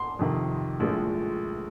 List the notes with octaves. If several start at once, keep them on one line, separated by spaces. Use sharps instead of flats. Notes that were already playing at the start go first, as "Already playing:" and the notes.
Already playing: C6
F2 C3 D#3
A#1 A2 F3 G#3